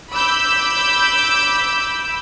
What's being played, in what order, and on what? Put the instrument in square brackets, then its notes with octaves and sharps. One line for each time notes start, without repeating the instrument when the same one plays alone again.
[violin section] B5 D6 E6 G6